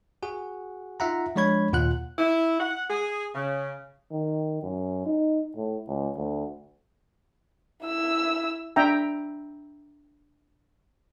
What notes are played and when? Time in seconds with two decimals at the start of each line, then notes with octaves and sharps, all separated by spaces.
0.23 F#4 G#4 F#5
1.00 D#4 F4 E5 F#5 A#5
1.36 F3 G#3 D4 C#5 B5 G#6
1.73 D#2 A#2 F4 F#5 F#6
2.19 E4
2.60 F#5
2.90 G#4
3.35 C#3
4.12 D#3
4.63 F#2
5.06 D#4
5.57 A2
5.88 C#2
6.16 D2
7.83 E4 E6
8.76 D4 E5 G5 A#5